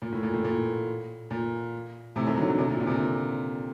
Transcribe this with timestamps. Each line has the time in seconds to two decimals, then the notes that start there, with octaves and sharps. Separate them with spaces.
0.02 A#2
0.12 A2
0.23 A#2
0.33 A2
0.44 A#2
1.31 A#2
2.16 A2 C3
2.26 C3 D#3
2.37 D3 F#3
2.48 D3 F#3
2.58 C3 D#3
2.69 A#2 D3
2.80 A#2 D3
2.87 C3
2.91 A#2